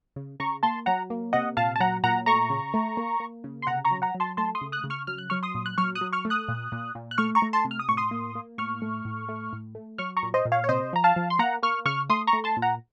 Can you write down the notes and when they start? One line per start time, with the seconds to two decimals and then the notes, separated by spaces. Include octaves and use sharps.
0.16 C#3
0.40 C#3 A#5 C#6
0.63 A#3 A5 C6
0.86 F#3 F#5 A#5
1.10 A#3
1.33 C3 D#5 F#5
1.57 A#2 F5 A5
1.76 A5
1.80 F#3 F#5 A#5
2.04 A#2 F#5 A#5
2.26 A3 A#5 C#6
2.50 C#3
2.74 A3
2.97 A#3
3.20 A#3
3.44 C#3
3.62 C6
3.67 C3 F#5 A#5
3.85 A#5 C#6
3.91 F#3
4.02 F#5 A#5
4.15 F#3
4.20 A5 C6
4.37 A3 A5 C6
4.55 C6 D#6
4.61 C#3
4.72 D#6 F#6
4.84 C#3
4.90 C#6 F6
5.07 F#3 F6
5.18 F#6
5.30 F#3 C#6 F6
5.43 C6 D#6
5.55 A#2
5.66 F#6
5.78 F#3 C#6 F6
5.95 D#6 F#6
6.01 F#3
6.13 C#6 F6
6.25 A3
6.30 D#6 F#6
6.48 A#2
6.72 A#2
6.95 A#2
7.11 F#6
7.18 A3 C#6 F6
7.35 A#5 C#6
7.42 A3
7.53 A5 C6
7.65 C3
7.71 F6
7.79 D#6
7.88 A2 C#6
7.97 C6 D#6
8.11 A#3
8.35 A#3
8.58 A2 C#6 F6
8.82 A3
9.05 A2
9.29 A3
9.53 A2
9.75 A3
9.98 F#3 C#6 F6
10.17 A#5 C#6
10.23 A#2
10.34 C5 D#5
10.45 A#2
10.52 C#5 F5
10.64 C#5
10.69 C3 C5 D#5
10.93 F3 A#5
11.04 F5 A5
11.16 F3
11.30 C6
11.39 A#3 F#5 A#5
11.63 A#3 C#6 F6
11.85 C#3 C#6 F6
12.10 A3 C6 D#6
12.27 A#5 C#6
12.33 A3
12.44 A5 C6
12.57 A#2
12.62 F#5 A#5